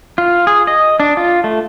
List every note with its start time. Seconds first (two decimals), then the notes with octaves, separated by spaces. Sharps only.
0.18 F4
0.47 G#4
0.67 D#5
1.00 D4
1.17 F4
1.44 A3